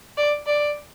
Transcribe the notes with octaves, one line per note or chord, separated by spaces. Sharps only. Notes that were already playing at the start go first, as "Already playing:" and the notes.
D5
D5